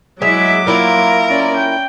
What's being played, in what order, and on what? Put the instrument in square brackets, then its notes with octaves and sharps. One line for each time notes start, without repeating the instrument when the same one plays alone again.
[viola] F#3 D6 [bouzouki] G#3 [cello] E4 E5
[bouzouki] A#3 E4 F4 [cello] A#4
[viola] C#4 D5
G5